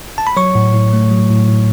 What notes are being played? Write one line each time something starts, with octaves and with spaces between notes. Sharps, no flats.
A5
B5
F#3 C#5 C#6
A2
A2
A3
F#3
A2
A2